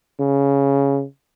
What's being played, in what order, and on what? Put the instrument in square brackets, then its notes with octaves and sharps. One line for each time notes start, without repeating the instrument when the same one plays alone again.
[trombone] C#3